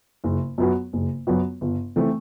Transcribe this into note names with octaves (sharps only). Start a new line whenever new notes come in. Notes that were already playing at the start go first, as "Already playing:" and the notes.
F#1
F#2 F#3 B3 F#4
F#1
F#2 F#3 B3 F#4
G1
E3 A3 C4